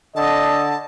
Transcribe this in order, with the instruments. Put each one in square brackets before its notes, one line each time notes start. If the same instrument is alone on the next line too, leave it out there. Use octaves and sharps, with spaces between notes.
[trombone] D3 [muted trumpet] D#5 [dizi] A5